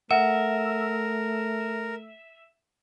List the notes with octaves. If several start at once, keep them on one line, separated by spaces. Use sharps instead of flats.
A3 A#4 E5 F#5